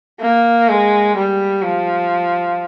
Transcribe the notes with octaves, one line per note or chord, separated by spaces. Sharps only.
A#3
G#3
G3
F3